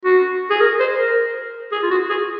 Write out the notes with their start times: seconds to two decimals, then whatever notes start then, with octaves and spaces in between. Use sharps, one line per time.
0.05 F#4
0.50 G#4
0.61 A#4
0.80 C5
0.99 A#4
1.72 G#4
1.83 F4
1.91 F#4
2.10 G#4